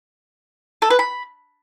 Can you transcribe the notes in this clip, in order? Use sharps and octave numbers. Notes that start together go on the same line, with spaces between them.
A4
B4
B5